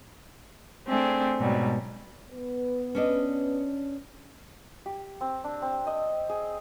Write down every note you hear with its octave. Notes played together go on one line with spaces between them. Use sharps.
A3 C4 D4 G#4
G#2 B2 F#3 G3
B3 B4
C#4 D4 D#5
G4
C4
D4
C4
D#5
G#4